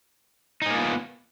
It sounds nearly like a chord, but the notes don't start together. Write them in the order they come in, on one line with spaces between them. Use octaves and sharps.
D#4 G#4 A#3 F4 B3